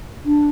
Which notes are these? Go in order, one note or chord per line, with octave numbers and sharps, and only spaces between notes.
D4